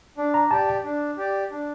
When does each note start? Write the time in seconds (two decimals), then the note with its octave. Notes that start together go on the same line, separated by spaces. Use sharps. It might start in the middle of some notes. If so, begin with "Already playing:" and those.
0.18 D4
0.34 A#5
0.51 G4 D5 A5
0.84 D4
1.17 G4 D5
1.51 D4